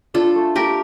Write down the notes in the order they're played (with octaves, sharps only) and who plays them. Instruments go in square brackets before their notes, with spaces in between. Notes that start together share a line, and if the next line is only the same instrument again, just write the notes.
[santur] D4 [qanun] F4 A4
[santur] A3
[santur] A3 [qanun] G4 A#4